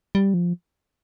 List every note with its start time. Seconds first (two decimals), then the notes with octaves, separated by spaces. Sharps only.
0.15 G3
0.34 F3